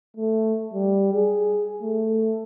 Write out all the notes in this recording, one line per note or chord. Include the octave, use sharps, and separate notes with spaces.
A3
G3
G#4
A3